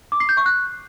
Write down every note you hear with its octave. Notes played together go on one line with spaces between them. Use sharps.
D6
C7
G6
C#6
F#6